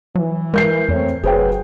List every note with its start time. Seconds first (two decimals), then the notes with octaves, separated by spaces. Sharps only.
0.15 E3 F#3
0.54 G#3 A#4 G6 C7
0.89 F2 A3 C4 C#5
1.23 F#1 F#3 G#4 B4 C5 G5